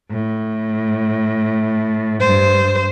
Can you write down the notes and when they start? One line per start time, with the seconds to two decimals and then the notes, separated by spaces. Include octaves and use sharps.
0.11 A2
2.20 G2 C5